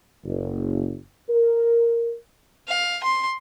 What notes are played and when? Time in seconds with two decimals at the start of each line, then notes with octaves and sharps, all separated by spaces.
0.25 F#1
1.30 A#4
2.68 F5
3.03 C6